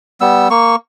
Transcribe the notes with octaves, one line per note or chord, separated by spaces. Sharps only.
G3 B3 E6
A#3 C#6